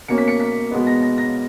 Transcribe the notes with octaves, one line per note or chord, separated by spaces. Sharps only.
B2 A#3 C#4 C#7
B6
C#7
B6
B2 G#3 B3
A#6
A#6
A#6